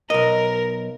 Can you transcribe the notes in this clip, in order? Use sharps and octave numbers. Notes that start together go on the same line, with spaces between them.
B1 A#4 D#5